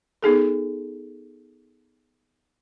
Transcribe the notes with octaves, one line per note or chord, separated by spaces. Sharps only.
B3 D#4 G#4 A4